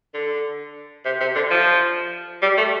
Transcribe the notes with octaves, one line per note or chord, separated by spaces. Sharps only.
D3
C3
C3
D3
F3
G3
A3